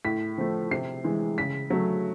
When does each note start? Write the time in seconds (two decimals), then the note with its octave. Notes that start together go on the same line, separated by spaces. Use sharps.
0.05 A2 B6
0.38 F3 A3
0.71 C3 C7
1.04 E3 G#3
1.38 C#3 B6
1.70 F#3 A3